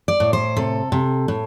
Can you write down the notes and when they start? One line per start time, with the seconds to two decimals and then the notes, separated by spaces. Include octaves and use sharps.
0.08 D5
0.20 A2
0.33 C5
0.56 C3 A4
0.92 C3
1.28 A2